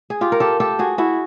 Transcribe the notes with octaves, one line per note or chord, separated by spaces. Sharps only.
G#4
F4 G4
A#4
G4 A4
G4 A4
F#4 G#4
E4 F#4